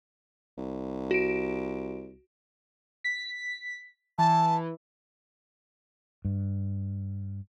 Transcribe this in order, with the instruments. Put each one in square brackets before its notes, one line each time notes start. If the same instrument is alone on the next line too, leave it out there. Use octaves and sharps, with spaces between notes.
[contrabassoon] C2
[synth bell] F#4 D7
[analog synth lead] B6
[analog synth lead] E3 [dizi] A5
[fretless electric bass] G2